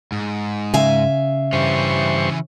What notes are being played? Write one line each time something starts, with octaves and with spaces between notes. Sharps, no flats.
G#2
C#3 E5 F5 G#5
G2 E3 C#4 C5 C#6